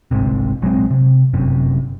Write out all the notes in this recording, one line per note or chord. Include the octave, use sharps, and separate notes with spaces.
G1 C2 G#2 C3
A#1 F#3 G#3 C4
C3
G1 F#2 C3